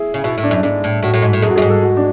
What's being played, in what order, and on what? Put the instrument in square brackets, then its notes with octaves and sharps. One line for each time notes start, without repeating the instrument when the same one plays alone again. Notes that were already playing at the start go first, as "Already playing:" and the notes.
Already playing: [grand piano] E4 G#4
[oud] C#3
[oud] B2 [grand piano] E4
[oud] A2
[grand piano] D4
[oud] F#2
[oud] G#2 [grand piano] D4
[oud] A2
[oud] A2 [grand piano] F#4
[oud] A2
G#2
A2
[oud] F#2 [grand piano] G#4
[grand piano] F#4
[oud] F#2 [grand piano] G#4
[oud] G#2
[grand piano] A4
F#4
D4